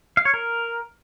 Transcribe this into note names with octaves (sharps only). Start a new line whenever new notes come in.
F5
C#5
A#4